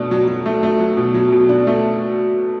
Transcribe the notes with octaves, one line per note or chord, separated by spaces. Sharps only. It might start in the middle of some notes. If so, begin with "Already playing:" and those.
Already playing: B2 A3 D4
F#3
F#3
A3
A3
F#3
B2
F#3
B2
D4
A3